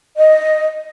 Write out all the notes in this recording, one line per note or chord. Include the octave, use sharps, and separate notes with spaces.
D#5